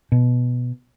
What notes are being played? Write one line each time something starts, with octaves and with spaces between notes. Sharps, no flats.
B2